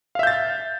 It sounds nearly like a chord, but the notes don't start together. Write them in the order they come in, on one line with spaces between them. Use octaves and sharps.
F5 E5 G6 A6